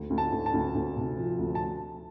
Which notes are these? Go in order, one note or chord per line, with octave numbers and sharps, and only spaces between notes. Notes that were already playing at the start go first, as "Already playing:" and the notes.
Already playing: D2
D2
A5
D2
A5
D2
D2
C3
F3
D2
A5